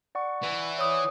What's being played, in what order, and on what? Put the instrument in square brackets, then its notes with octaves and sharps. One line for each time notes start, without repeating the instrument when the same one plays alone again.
[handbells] D5 F#5 C#6
[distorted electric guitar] E3
[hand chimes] C#5 D6 D#6